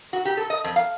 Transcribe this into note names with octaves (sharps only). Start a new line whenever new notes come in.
F#4
G4
A4
D#5
F2
F5